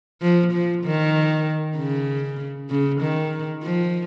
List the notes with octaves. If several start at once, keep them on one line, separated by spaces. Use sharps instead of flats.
F3
F3
D#3
C#3
C#3
D#3
F3